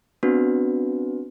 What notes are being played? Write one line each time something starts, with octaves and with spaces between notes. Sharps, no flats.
B3 C4 D4 F#4 B4